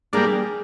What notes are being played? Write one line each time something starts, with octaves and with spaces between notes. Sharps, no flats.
G3 A#3 D4 G#4